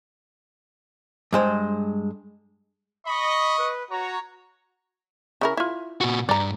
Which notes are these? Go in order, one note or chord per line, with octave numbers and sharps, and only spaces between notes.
G2 G#3 C5
D#5 B5 C#6
B4
F#4 C#5 A#5
C#3 E4 A#4
E4 F4
A#2 F#4
G2 D5 A#5